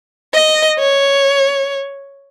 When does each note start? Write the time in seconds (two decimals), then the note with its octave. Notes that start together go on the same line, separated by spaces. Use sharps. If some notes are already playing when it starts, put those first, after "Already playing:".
0.34 D#5
0.79 C#5